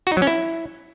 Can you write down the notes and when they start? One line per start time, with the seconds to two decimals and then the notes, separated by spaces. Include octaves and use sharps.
0.07 F#4
0.12 D#4
0.17 F#3
0.22 C#4
0.27 E4